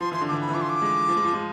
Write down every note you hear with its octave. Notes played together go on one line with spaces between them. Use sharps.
F3 C6
E3 C6
D3
E3 D6
B5
E3
F3 D6
C6
D6
G#3
F3
G#3
F3
G#3